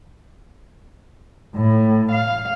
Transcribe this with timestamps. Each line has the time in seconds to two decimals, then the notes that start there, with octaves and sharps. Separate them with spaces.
1.55 A2
2.12 F5